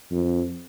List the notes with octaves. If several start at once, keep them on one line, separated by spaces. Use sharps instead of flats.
F2